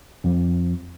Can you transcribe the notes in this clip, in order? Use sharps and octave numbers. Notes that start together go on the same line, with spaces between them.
F2 F3